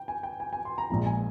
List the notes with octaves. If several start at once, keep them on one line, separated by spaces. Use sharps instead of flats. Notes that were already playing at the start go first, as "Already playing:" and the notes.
Already playing: G5
G#5
G5
G#5
G#5
C6
A#5
A#1 G#2 F3 A#5
G#5